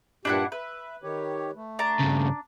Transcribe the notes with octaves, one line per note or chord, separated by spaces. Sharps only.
G2 A#2 D4 E4 G4 F#5
B4 E5
D#3 G4 C#5
A3
D4 A#5
G2 C#3